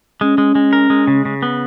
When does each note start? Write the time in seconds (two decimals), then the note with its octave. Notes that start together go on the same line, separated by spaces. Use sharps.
0.21 G#3 C#4
0.38 G#3
0.55 G#3
0.73 A#4
0.90 G#3
1.08 C#3
1.25 C#3
1.42 B3